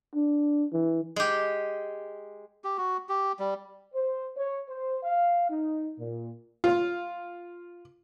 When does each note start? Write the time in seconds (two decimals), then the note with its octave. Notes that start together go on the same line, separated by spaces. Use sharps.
0.15 D4
0.73 E3
1.16 G#3 G4
2.64 G4
2.77 F#4
3.09 G4
3.39 G3
3.95 C5
4.36 C#5
4.69 C5
5.04 F5
5.50 D#4
5.99 A#2
6.64 F4